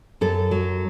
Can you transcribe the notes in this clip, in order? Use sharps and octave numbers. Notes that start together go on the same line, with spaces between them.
F#2 A4
F#3